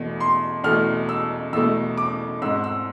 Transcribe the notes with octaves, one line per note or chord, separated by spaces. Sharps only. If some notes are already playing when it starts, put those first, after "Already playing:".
Already playing: E2 B2 A3
C6
E2 B2 A3 F6
E6
E2 B2 A3 E6
D6
G#1 G#2 G#3 E6
E6